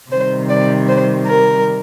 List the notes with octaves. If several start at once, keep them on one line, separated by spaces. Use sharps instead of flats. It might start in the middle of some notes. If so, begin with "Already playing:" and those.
C3 D#3 G3 C5
D5
C5
A#4